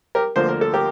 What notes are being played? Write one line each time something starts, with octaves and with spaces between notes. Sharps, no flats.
G4 A#4
D2 D3 F3 A#3 C5
A#4
A4
G4 A#4